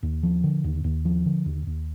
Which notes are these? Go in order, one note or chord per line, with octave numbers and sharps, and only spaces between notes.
D#2
F3
D3
D#2
D#2
F3
D3
D#2
D#2